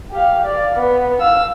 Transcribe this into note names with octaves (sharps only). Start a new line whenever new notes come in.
G4 F5
D5 F5
B3
F5 E6